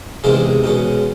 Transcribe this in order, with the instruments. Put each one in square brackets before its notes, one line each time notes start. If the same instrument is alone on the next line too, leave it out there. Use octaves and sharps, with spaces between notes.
[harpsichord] E2 C3 D#3 G#3 C4 F5
B2 G#3 C#4